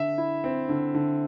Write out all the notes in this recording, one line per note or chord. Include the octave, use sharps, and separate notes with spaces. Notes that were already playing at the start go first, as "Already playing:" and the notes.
Already playing: D3 E5
E4
C4
D3
D3